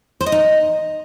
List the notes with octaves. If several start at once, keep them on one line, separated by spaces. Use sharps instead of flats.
C5
D#5
D#4